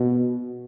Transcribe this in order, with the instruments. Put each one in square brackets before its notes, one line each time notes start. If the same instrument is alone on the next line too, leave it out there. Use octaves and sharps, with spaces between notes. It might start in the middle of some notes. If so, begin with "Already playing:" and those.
Already playing: [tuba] B2